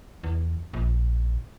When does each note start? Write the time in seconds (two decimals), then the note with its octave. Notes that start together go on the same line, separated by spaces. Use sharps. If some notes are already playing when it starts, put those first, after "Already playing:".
0.23 E2
0.73 A#1